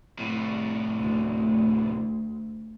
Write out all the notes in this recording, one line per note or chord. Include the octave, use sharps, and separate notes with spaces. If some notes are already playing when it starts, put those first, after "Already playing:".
C2 A2
D2